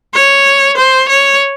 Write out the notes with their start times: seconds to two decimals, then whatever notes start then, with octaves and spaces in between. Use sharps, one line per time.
0.14 C#5
0.77 C5
1.09 C#5